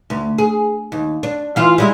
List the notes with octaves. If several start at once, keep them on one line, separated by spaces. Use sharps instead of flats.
D2
G#4
D#2
D4
E3 F4 E5
G3 G#3 E4